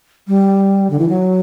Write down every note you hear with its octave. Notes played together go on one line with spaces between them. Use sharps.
G3
D3
E3
F#3